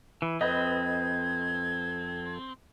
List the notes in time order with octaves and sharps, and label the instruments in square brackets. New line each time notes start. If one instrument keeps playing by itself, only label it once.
[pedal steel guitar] E3 [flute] B5
[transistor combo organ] F2 A4 [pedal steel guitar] C4 [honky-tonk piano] B4 D#5 [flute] G#6